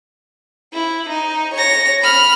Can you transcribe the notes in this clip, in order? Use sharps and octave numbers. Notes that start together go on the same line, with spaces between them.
E4
D#4
C#5 A#6
B5 F6